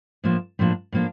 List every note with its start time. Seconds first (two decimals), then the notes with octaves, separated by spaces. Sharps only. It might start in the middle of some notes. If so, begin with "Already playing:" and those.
0.24 A2 F3 A#3 D4
0.59 A2 F3 A#3 D4
0.92 A2 F3 A#3 D4